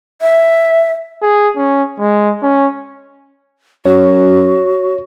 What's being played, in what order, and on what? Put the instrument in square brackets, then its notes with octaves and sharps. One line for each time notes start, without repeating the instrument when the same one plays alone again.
[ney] E5
[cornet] G#4
C#4
G#3
C#4
[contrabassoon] F#2 [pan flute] F#4 [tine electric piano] C#5